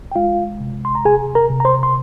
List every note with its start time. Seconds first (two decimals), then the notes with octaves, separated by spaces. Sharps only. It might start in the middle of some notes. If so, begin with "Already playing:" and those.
0.12 G5
0.15 G#3 F4 F5
0.60 C3
0.85 C6
0.95 A#5
1.05 C3 G#4 G#5
1.35 A#4 A#5
1.50 C3
1.60 A#5
1.65 C5 C6
1.83 C6